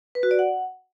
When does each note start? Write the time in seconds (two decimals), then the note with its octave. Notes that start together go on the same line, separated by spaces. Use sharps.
0.15 B4
0.23 F#4
0.31 D5
0.39 F#5